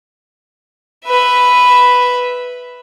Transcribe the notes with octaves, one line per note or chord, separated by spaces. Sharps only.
B4 E5